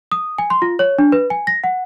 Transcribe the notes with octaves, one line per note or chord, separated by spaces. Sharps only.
D#6
G#5
C6
F4
C#5
D4
B4
G#5
A#6
F#5